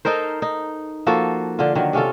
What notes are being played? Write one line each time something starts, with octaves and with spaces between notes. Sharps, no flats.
D#4 A4 A#4 C5
D#4
F3 A#3 F#4 A4
D3 F4
D3 D#3 F#3
C3 C#4 F4 A4